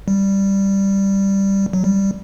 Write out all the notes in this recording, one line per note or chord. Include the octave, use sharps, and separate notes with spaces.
G3
F#3
G3